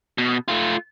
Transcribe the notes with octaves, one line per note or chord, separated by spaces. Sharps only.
B2
A3 F4